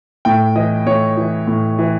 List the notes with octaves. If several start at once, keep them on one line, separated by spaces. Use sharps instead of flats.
A2 G5
E3 D#5
A2 C#5
E3
A2
E3